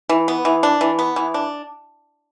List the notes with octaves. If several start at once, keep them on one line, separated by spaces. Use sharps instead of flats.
E3
B3
E3
D4
E3
B3
E3
D4